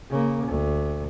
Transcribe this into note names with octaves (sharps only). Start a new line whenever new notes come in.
C#3 A#3
D2